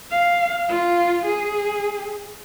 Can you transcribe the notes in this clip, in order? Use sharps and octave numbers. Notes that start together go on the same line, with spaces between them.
F5
F4
G#4